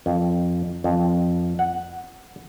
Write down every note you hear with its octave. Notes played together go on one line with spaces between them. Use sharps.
F2
F2
F#5